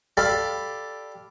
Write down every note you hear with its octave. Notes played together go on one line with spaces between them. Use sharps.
G4 A4 D5 F5 B5